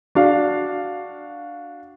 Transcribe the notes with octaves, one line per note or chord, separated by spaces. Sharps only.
D4 F#4 F5